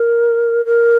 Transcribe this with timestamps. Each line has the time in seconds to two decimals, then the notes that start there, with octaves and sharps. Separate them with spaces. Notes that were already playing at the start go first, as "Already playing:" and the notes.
Already playing: A#4
0.65 A#4